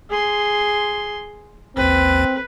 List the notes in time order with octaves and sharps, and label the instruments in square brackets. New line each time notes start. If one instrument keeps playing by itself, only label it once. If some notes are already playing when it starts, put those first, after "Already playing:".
[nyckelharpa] G#4 C6
[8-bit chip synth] A1 D#2 [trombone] C4 [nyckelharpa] B4